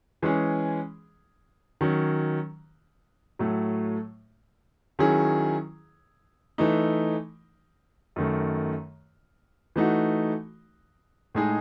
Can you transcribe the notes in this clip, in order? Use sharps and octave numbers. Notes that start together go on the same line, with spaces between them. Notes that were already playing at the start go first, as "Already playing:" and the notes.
E3 G#3 C#4 G#4
D#3 F#3 C#4
A2 F#3 A3
D#3 F#3 C#4 E4 G#4
E3 A3 D#4
F#2 D#3 A3
E3 A3 D#4 F#4
A2 G#3 D#4 G#4